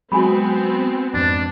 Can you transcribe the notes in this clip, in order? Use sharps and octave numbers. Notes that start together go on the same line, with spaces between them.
F#3 G#3 B3 C4 F#4 G#5 B5
F2 G#2 D4